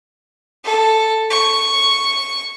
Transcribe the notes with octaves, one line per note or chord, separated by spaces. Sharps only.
A4
C#6